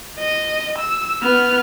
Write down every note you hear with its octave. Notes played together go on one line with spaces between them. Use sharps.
D#5
E6
B3 F6